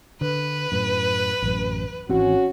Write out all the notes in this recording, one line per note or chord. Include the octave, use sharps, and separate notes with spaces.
D3 B4
F#2 A2
A1 F#2
G#1 E3 C4 C#4 F#4